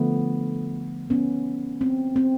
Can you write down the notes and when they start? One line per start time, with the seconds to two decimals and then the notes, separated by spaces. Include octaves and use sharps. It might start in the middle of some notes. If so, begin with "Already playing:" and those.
Already playing: D3 F3 A3 B3
1.10 B3 C#4
1.81 C4
2.16 C4